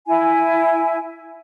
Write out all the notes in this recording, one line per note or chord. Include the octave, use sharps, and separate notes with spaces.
E4 G#5